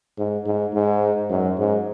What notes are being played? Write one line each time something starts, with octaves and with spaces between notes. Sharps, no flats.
G#2
G#2
G#2
F#2
G#2